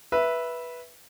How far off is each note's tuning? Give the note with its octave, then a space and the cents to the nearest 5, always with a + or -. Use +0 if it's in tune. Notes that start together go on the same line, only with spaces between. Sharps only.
B4 -10 E5 +0